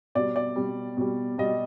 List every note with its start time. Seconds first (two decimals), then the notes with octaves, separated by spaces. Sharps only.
0.15 B2 G3 D5
0.36 D5
0.56 B2 G3
0.97 B2 G3
1.38 B2 G3 D#5